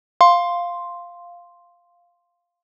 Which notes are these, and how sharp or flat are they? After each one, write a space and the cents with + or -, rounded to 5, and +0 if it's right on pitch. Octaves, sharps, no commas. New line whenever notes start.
F5 +0 C6 +0